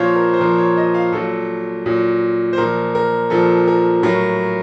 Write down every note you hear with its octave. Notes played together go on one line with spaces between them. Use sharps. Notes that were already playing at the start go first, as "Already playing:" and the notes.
Already playing: A#2 F3 C5 C#5 F5
A#4
C5
A#2 F3 A#4
C#5
D#5
F5
A#2 F#3 A4
A#2 F#3
C5
A#2 F3 A#4
A#4
A#2 F3 A4
A#4
A2 F#3 A#4